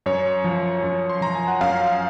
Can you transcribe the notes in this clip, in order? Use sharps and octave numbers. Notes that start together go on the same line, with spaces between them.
F#2 C#5
F3
F#2
C6
F3 A#5
G#5
F#5
F#2 F5